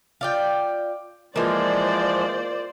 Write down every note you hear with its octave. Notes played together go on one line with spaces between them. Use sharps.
F4 D5 G5
E3 F3 G#3 A#3 F4 C5 D5